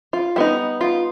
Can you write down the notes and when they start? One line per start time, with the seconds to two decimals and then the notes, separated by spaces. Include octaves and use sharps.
0.13 F4
0.36 G3 B3 D#4 E4
0.81 F4